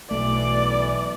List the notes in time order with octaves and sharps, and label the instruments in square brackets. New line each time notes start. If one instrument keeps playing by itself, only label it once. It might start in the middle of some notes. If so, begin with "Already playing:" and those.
[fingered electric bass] B1 A3 [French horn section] B2 E3 [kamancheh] D5 [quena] D6